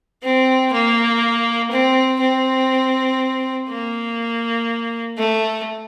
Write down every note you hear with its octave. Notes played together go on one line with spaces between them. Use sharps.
C4
A#3
C4
C4
A#3
A3